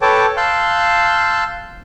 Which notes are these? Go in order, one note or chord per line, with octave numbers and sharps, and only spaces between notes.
A4 B4 C#5 G5 A5 D6
F5 A5 C6 E6 F#6 G6